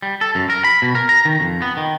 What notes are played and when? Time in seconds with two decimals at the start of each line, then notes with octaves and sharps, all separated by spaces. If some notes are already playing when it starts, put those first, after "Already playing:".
0.02 G3
0.21 A4
0.35 F#2
0.50 A#4
0.64 B5
0.82 B2
0.95 A#4
1.09 A#5
1.25 D#3
1.40 F2
1.62 B3
1.77 D#3